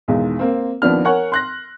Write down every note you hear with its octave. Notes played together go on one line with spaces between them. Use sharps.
B1 E2 D#3 G#3
A#3 C4
D#2 F3 B3 D4 F6
A#4 C#5 F#5 G#5 C#6 F#6
C6 F#6 A#6